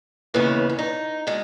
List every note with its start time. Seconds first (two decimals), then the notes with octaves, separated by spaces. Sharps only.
0.34 D#2 C#3 E3 B3 C#4
0.69 C#4
0.79 D#4
1.27 B2 G#3